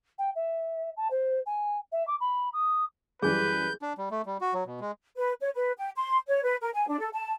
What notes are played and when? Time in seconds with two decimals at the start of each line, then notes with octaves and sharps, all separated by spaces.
0.19 G5
0.35 E5
0.97 A5
1.11 C5
1.46 G#5
1.92 E5
2.07 D6
2.21 B5
2.53 D#6
3.22 F#2 E3 G3 G#4 B4 G6
3.82 D4
3.98 G3
4.11 A3
4.26 G3
4.41 F#4
4.54 F#3
4.66 B2
4.80 G#3
5.16 B4
5.41 C#5
5.55 B4
5.77 G5
5.96 C6
6.28 C#5
6.43 B4
6.61 A#4
6.75 G#5
6.88 D4
7.00 A4
7.13 A5